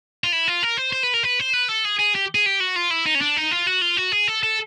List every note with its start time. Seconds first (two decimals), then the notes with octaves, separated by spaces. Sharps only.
0.24 F4
0.32 E4
0.48 F4
0.63 A#4
0.77 C5
0.93 C5
1.03 B4
1.14 A#4
1.23 B4
1.39 C5
1.53 B4
1.69 A4
1.85 G#4
1.99 G#4
2.15 G4
2.35 G#4
2.46 G4
2.60 F#4
2.76 F4
2.91 E4
3.06 D#4
3.15 C#4
3.21 D4
3.37 D#4
3.52 F4
3.67 F#4
3.82 F4
3.97 F#4
4.12 G#4
4.28 A4
4.43 A4